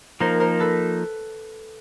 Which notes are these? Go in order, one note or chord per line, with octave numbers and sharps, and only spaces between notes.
F3 A#3 D#4 A#4 C5
A#4 C5
A4 B4